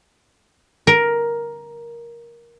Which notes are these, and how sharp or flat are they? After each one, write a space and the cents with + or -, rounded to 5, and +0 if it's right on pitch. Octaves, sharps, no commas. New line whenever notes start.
A#4 +10